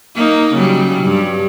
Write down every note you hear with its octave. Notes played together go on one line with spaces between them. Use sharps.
A#3 D#4
C#3 F#3 G3
G2